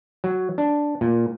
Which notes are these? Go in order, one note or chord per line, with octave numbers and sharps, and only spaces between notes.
F#3
D4
A#2